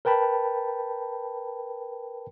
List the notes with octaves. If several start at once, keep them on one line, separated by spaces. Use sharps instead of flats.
A#4 B4 G5 A5 B5